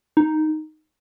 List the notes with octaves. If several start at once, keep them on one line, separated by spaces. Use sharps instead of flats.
D#4